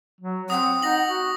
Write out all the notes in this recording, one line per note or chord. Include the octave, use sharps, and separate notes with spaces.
F#3
C4 F#5 D#6
D#4 A#6 F#7
F#4